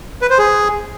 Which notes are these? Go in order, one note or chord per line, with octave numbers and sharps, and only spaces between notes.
B4
C5
G#4